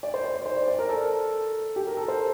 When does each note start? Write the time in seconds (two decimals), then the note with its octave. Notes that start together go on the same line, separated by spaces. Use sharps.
0.03 D5
0.14 C5
0.24 D5
0.36 C5
0.46 C5
0.57 D5
0.68 D5
0.79 A#4
0.89 A4
1.76 G4
1.87 A#4
1.97 A4
2.08 C5